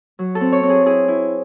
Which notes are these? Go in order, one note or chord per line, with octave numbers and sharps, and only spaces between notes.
F#3
A4
C4
C#5
C4
G#4
E4 G#4
E4